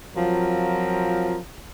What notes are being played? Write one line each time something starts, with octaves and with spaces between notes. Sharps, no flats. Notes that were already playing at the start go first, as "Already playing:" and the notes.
F3 F#3 C4 F4 A#4